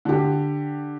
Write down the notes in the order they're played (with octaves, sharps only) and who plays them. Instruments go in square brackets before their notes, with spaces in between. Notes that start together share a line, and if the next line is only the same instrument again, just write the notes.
[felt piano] D3 G4